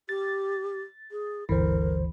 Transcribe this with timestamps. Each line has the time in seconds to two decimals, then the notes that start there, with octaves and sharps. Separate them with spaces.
0.09 G4 A6
1.11 G#4
1.49 G1 D2 E3 A#4 C5